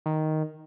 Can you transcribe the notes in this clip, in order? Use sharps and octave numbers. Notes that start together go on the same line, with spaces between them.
D#3